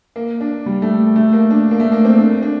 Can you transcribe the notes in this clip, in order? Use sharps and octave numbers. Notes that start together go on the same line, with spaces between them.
A#3
D4
G3
A3
A3
A#3
D4
A#3
A3
A#3
C4
D4
D4